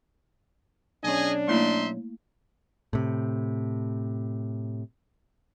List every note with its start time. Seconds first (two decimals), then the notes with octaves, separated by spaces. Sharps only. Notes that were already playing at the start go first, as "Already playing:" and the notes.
1.04 B1 C#4 D4 G#4 D#5 G#5
1.48 A3 A#3 D#4 E4 E5 C6
2.93 A2 C3